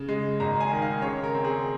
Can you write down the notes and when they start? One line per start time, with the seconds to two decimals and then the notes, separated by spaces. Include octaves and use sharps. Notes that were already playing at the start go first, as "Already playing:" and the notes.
Already playing: C#3
0.09 G#3
0.40 G#1 A#5
0.61 G#5
0.71 D#3
0.82 F5
1.02 C#3 C#5
1.24 A#4
1.35 C4
1.44 G#4